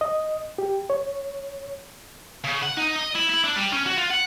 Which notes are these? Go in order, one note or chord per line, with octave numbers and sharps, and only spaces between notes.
D#5
G4
C#5
C#3
F#5
D#4
D#5
E4
E4
D4
G3
C#4
F#4
F4
F#5